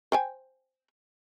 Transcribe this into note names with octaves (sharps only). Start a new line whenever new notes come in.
C5 G5 G#5